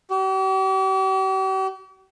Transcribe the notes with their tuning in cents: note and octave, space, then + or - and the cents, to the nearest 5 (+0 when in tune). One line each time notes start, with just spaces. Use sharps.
G4 -45